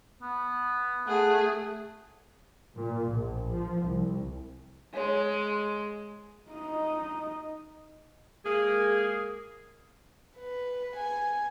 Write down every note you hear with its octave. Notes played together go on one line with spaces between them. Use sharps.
B3
A3 G#4 F#5
A#2
A#1
F3
C2
G#3 C#5 G#5
D#4 D#5
G#3 A#3 G#4
B4
G#5